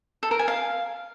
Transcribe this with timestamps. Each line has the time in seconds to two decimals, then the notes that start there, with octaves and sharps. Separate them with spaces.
0.23 A4
0.31 A#4
0.39 G#5
0.48 F5